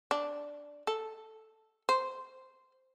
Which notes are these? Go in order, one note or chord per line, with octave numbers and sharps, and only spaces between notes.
D4
A4
C5